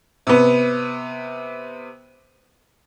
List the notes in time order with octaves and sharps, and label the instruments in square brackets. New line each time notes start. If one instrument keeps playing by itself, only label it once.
[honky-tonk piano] C3 B3